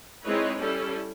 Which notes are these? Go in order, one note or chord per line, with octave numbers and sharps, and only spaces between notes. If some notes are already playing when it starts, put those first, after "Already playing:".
G#3 C4 D#4 E4 B4 C#5
G3 C#4 E4 A4